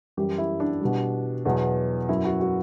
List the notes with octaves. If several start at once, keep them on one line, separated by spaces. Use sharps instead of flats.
F#2 E3 G3 G4
E4
D4
B2 G3
E2 B2 F#3
F#2 F#3 E4
F#4
F#4